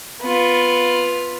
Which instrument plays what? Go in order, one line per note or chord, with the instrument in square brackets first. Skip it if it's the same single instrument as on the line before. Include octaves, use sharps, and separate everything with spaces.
[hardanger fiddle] B3 F4